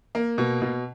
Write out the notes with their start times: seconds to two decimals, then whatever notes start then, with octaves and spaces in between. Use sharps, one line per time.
0.15 A#3
0.38 B2
0.62 B2